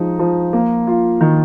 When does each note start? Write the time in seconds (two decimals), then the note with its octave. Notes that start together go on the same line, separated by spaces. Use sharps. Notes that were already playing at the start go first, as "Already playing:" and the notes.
Already playing: F3 G#3 D#4
0.19 F3
0.53 A#3
0.87 F4
1.21 D#3